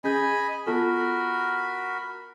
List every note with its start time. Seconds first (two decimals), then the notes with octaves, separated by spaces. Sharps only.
0.04 C#4 G#4 D#5 G#5 B5 G6
0.67 B3 F4 F#4 A4 A#4 B5